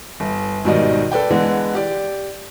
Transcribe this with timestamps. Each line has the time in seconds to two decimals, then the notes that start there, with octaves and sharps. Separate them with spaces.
0.20 G1
0.65 G#1 B2 D#3 G3 D5 D#5
1.12 A4 B4 D5 G5
1.30 D3 E3 G#3 B3
1.75 G4 D5